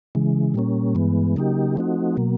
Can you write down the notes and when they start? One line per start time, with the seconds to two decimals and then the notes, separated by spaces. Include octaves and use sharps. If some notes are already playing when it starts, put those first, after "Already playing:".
0.15 C#3 E3 G#3
0.54 A#2 G3 A#3 C#4
0.95 G2 E3 G#3 B3
1.36 C#3 F#3 A#3 D#4 G4
1.76 F3 A3 C4 D#4 F#4
2.17 B2 F#3 A#3